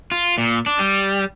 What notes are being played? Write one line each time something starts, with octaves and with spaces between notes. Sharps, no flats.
F4
A#2
D4
G3